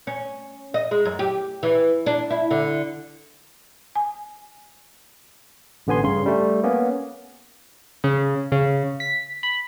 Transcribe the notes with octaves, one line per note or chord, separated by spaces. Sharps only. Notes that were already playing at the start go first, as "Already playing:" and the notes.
C#4
D#5
G#3
F#2
G4
E3
D4
E4
D3
G#5
A1 D3 B3 G#5 C6
G2 C#3 C6
G3 A3
A#3 B3 C#4
C#3
C#3
B6
B5